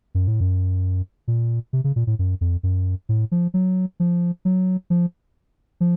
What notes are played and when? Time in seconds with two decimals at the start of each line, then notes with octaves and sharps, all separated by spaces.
0.15 F#2
0.28 A2
0.41 F#2
1.28 A#2
1.73 C3
1.84 C#3
1.96 A#2
2.07 A2
2.19 F#2
2.41 F2
2.63 F#2
3.09 A2
3.32 F3
3.54 F#3
4.00 F3
4.45 F#3
4.90 F3
5.80 F3